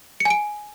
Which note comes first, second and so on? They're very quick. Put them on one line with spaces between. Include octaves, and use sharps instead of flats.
C#7 G#5 D7